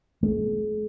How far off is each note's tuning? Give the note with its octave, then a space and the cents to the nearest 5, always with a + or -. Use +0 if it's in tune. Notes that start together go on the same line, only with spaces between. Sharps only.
G#3 +45